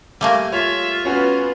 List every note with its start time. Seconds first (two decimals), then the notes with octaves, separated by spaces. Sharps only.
0.21 G3 A3 A#3 G#5
0.52 F4 C#5 E5
1.05 B3 C#4 F#4 B4